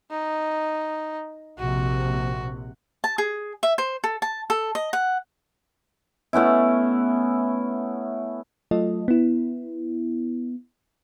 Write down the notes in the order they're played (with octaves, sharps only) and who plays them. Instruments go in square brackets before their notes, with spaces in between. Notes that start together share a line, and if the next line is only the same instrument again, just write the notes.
[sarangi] D#4
[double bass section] A#1 C3 [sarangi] F#4
[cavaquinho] A5
G#4
E5
C5
A4
A5
A4
D#5
F#5
[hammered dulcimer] A3 B3 C#4 E4
[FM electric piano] F#3 A3 F4 A4 D#5
B3 E4